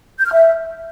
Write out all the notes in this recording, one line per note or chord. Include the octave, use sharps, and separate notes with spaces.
G6
F6
E5